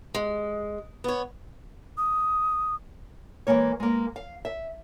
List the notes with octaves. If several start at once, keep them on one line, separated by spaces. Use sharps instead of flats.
G#3
B3 C#5
D#6
E3 F3 G#3 A#3 C#5
G#3 A#3
F5
E5